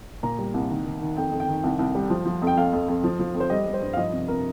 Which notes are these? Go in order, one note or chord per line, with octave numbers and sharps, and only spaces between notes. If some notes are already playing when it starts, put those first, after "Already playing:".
A#2 A#5
G3
C2
D#3
D#3
D#3
F2 G5
F2
G5
D#3
C2
C2
G3
F3
F3
F2
G5
F2 F5
F2
F2
F3
F3
F2
C5
G3 D#5
G3
C5
G2
F5
F3 D#5
C3
C3 A#4